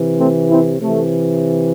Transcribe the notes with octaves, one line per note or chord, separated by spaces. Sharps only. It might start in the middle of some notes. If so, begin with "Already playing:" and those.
Already playing: C3 E3
A3 C4
C4 E4
C3 E3 A3